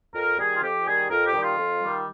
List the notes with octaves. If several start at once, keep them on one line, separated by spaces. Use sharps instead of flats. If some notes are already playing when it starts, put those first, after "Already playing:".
F2 A#4
D#3 G3 G#4
F4
F2 G4
D#3 G3 G#4
F2 A#4
G4
D#3 G3
F4
F2
D#3 G3